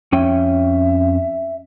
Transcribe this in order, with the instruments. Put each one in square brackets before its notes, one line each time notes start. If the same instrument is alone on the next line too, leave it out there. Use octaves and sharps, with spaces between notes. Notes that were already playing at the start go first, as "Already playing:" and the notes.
[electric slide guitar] F2 C#4 G5 [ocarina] E5